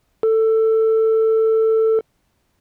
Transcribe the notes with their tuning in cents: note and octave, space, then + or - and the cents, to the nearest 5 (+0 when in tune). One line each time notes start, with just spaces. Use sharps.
A4 +15